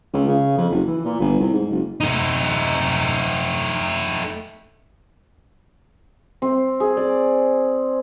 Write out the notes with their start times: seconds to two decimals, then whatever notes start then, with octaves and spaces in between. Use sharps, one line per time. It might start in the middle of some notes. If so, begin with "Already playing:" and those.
0.13 C#2
0.28 C#3
0.58 F2
0.70 F#1
0.87 E3
1.04 A#2
1.20 G1
1.39 C2
1.53 G#2
1.71 F#1
2.00 A3 D#4
6.42 C4
6.80 G#4
6.97 D5